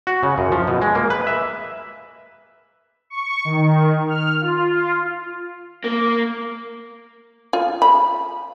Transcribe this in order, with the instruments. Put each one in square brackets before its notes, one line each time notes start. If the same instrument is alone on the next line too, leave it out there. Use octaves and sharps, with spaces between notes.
[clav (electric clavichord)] F#4
C#3
F#2
F3
B2
G#3
A#3
B4
E5
[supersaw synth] C#6
D#3
F6
F4
[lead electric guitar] A#3
[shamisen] F4
B5